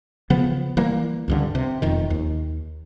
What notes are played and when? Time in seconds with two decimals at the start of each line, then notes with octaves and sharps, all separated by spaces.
0.30 C#3 F3 B3
0.77 E3 G3 A#3
1.28 C#2 G2 D3
1.55 C3
1.82 E1 F2 D#3
2.10 D#2